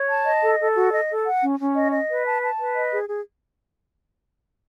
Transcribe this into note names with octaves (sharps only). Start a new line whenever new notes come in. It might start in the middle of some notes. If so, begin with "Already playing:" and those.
Already playing: C#5
A5
D#5
A4
A4
F#4
D#5
A4
F#5
C#4
C#4
D#5
D#5
B4
A5
A5
B4
D#5
G#4
G#4